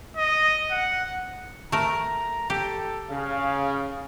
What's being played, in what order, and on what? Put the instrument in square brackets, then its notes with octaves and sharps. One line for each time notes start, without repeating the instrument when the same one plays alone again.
[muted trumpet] D#5
F#5
[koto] A3 A#4 [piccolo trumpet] A#5
[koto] G4 [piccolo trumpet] A4
[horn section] C#3 [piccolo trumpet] F5